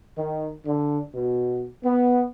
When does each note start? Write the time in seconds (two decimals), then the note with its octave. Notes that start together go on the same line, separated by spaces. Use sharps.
0.18 D#3
0.66 D3
1.14 B2
1.84 B3